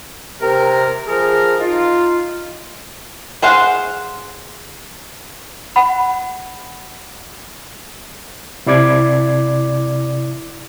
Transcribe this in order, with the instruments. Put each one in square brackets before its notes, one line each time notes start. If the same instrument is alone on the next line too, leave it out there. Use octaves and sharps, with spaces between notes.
[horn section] C3 A#4
F3 G#4 A#4
D#4 F4
[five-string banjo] G#4 C5 F5 F#5
[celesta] F#5 B5
[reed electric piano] C3 E4 D5 D6 G#6